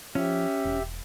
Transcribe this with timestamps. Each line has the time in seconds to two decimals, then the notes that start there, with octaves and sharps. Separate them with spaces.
0.15 F3 C#4 G4 E5
0.65 E1